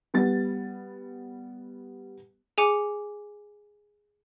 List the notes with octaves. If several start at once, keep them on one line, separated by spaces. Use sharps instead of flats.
G3 B3 A6
G#4 G#5 D6 C#7